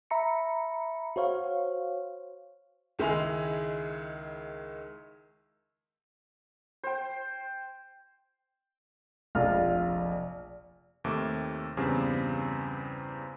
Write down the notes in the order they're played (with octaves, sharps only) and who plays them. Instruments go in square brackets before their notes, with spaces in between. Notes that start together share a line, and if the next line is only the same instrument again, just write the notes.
[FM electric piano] E5 A#5 B5 C#7
F#4 C5 C#5 F5
[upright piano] C#2 D#3 G#3 E4 G#5 F7
[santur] C5 G5
[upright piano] F1 A#1 F4 F6
[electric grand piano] D#2 C3 A3 D6
E2 G2 C#3 G3 C4